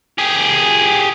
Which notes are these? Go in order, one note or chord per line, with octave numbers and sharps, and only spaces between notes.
G4 G#4